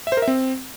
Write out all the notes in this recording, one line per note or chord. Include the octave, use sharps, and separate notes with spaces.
E5
C5
A#4
E5
C4